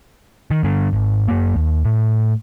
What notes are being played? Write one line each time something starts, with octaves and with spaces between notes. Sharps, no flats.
D#3
G2 D3
G#1
F#2 A#3
D#2
A2